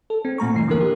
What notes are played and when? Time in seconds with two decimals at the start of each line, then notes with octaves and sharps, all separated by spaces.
0.10 A4
0.25 C4
0.38 A#2 A3 A#5 C#6
0.55 G2 E3 C7
0.68 D3 E3 F3 A#3 A#4
0.81 G4